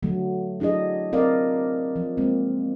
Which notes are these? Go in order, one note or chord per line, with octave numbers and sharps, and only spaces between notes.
D3 F#3 A3
F#3 D4 E4 G#4 D#5
C4 A#4 D5 D#5 F5
F3
G#3 A#3 C4